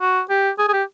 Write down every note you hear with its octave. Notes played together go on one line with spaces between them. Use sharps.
F#4
G4
G#4
G#4
G4